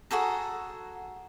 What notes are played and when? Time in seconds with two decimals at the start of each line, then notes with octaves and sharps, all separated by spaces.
0.11 F#4 G#4 A4 A#5